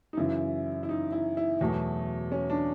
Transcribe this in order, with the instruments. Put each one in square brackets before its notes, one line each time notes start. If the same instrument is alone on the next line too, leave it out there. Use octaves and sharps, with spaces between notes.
[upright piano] D#4
F#2 C#3 E3 E4
E4
D#4
E4
E4
E2 B2 F#3 A3
C#4
D4